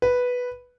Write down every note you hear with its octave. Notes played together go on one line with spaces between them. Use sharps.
B4